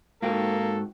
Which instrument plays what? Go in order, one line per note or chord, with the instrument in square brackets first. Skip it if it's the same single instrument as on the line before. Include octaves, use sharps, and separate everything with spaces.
[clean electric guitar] G#2 F#4 G5 [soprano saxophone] A#3 [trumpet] A4